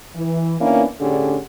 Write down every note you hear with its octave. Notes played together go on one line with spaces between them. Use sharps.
E3
D#3 A#3 B3 C#4 D4 E4
A2 D3 C#4 D4 G4 G#4